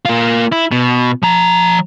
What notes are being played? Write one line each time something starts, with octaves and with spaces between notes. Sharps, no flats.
A#3 F4
E4
B2
F3 A#5